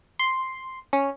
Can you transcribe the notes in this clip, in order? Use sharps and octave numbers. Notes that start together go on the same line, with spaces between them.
C6
C#4